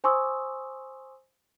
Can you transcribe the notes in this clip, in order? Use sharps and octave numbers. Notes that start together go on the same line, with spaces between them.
C5 G#5 C6 C#6 D#6 E6